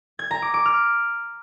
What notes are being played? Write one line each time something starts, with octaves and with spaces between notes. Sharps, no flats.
G#6
A#5
D6
D6
F6